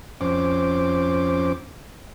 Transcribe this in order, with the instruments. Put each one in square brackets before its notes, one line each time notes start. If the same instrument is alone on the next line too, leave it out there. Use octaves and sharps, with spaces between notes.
[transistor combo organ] F2 C#4 C5 D6